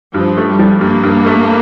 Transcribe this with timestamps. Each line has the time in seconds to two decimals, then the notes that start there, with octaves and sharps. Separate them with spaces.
0.14 G2 F3
0.37 A3
0.48 G3
0.59 F3
0.81 G2 A#3
1.03 G2
1.26 A3